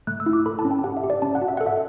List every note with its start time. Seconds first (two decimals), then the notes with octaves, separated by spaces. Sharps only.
0.07 A3 F#6
0.20 E6
0.26 E4
0.33 D6
0.46 A4 B5
0.59 A5
0.65 C#4
0.71 G5
0.84 G4 F#5
0.97 E5
1.04 G4
1.10 D5
1.22 C#4 A5
1.35 F#5
1.42 F#4
1.48 E5
1.57 A4 F#5
1.66 E5